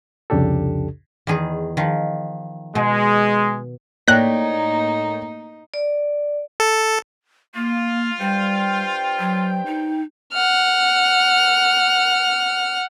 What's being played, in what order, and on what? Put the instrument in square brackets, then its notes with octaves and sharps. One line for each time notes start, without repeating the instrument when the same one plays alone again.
[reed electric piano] C2 F2 C#3 D4 G4 A4
[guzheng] E2 D#3 G#4
D#3 F3
[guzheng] B2 [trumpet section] G#3
[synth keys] A2 A#3 [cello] D#4 [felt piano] C#5 D5 G5 [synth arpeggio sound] F#6 A#6
[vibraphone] D5
[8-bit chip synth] A4
[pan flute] A#3 [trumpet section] F4
[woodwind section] G2 C5 G5 [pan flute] G3
[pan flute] F#3
D#4
[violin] F#5 F6